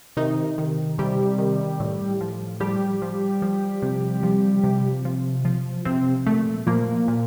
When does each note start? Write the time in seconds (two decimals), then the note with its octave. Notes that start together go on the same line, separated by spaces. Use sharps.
0.17 C3 D#3 D#4
0.58 D#3
0.99 C3 G3 G4
1.38 D#3
1.80 A2
2.21 F3
2.60 F3 G3 G4
3.02 F3
3.42 F3
3.82 C3
4.23 F3
4.64 C3
5.05 F3
5.45 F3
5.85 C3 F3 C4
6.26 A#2 A3
6.67 A#2 F3 A#3
7.08 A#2